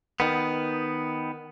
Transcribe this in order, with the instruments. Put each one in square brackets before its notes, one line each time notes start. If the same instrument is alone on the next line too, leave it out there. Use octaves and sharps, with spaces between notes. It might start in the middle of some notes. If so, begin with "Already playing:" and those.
[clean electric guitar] D#3 B3